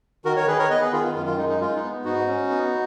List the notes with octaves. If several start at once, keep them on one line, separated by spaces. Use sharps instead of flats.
D#3 F#4 A#4
A#4 C#5
D#3 G#4 B4
A#4 C#5
B3 B4 D#5
G#4 B4
D#3 F4 G#4
F4
F#2 F4
F4
G#3 D#4
D#4
G#3 F4
D#4
B3
G#2 D#4 F#4
C#4
B3